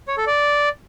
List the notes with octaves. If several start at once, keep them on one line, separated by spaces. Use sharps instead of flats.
C#5
A4
D5